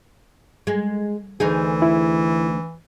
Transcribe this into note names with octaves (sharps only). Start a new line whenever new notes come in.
G#3
D2 E3 D#4 G#4
E4